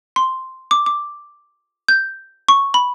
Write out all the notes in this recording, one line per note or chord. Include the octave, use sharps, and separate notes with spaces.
C6
D6
D6
G6
C#6
B5